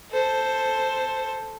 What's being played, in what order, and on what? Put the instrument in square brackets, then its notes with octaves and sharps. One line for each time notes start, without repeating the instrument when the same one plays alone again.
[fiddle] A4 C5